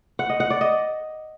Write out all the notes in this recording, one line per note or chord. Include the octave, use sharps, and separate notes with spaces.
F#5
D#5
F#5
D5
D#5